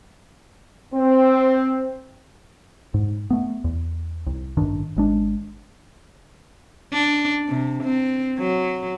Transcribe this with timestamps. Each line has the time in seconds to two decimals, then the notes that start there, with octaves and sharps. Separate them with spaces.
0.94 C4
2.94 G#2
3.30 A3 B3
3.64 E2
4.26 C2
4.57 A1 G2 D#3 D4
4.96 G#1 G#3 D4
6.93 D4
7.48 C3
7.83 C4
8.38 F#3